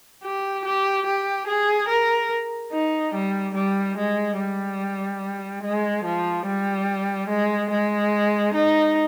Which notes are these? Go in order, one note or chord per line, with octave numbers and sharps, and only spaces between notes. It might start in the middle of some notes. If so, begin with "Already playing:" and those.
G4
G4
G4
G#4
A#4
D#4
G3
G3
G#3
G3
G#3
F3
G3
G#3
G#3
D#4